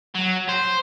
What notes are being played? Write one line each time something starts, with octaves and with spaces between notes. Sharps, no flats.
F#3
C5